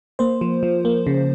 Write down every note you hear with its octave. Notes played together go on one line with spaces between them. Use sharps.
A#3 C5
F3
F3
A#3
C#3